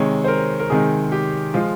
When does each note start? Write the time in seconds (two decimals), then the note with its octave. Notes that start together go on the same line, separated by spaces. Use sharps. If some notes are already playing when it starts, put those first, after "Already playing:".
Already playing: C3 D#3 G#3 C#5
0.24 C5
0.28 A#4
0.59 A#4
0.70 C3 D#3 G#3 G#4
1.12 G4
1.54 F3 G#3 F4